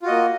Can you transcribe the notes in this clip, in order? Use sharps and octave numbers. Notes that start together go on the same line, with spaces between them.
A#3 F4 F#4 D#5